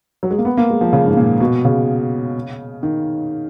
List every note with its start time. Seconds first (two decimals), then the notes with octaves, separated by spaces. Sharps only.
0.23 F#3
0.31 G#3
0.38 A#3
0.45 B3
0.57 A#3
0.70 G#3
0.81 F3
0.93 C#3
1.07 G#2
1.17 A#2
1.40 B2
1.65 C#3
2.83 D#3